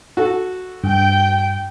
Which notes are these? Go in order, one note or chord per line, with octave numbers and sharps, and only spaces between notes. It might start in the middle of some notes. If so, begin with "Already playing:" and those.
F#4 A4
G2 G5